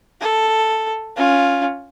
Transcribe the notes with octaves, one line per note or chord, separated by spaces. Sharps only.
A4
C#4 F4